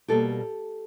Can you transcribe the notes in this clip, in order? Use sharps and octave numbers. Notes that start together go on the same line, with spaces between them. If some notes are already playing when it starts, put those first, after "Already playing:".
B2 G3 A#3 G4 A4